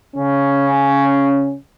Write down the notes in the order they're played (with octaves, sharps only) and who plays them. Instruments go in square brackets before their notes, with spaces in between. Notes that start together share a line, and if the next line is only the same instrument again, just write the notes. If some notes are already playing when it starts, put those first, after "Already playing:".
[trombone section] C#3 C#4